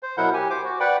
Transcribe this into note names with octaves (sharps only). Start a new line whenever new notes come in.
C5
B2 F#3 E4 A#4 F#5 G6
G4 G#5
C5 D6
F#4
B4 D5 F#5 G5 B5